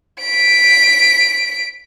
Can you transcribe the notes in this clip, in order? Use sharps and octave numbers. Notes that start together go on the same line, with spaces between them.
B6 D7